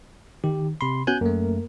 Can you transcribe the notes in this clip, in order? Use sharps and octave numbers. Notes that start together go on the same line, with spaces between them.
D#3 G4
C3 B5 C6
B3 C#4 F#4 G#5 F#6 G6
F#2 A3 A#3 A#4